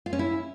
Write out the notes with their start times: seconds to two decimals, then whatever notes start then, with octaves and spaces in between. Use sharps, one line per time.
0.06 F4
0.13 C#4
0.19 E4